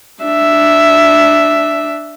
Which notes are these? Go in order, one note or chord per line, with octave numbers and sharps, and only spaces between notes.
D4 E5